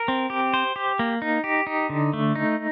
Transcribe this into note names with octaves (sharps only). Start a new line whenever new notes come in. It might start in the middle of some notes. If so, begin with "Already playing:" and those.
Already playing: A#4
C4
G4
C5
G4
A#3
D#4
G4
D#4
D3
A3
D#4